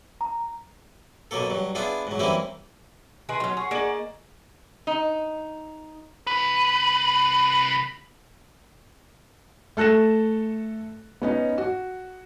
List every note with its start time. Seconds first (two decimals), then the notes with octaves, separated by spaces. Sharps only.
0.21 A#5
1.31 B2 F#3 A#3 A4
1.50 G2 F#3
1.75 B3 D4 E4 F4 G#4
2.07 G#2 F#3
2.19 F#2 E3 G3 A#3 C4 E4
3.29 D#3 G#4 B4 C6
3.40 F#3 C#4
3.57 G#4 F#5 C#6
3.71 A#3 G#4 D5 D#5 F#7
4.87 D#4
6.27 C2 B4
9.77 A3 A4 F#6 A#6 E7
11.22 B3 C#4 D#4
11.58 F#4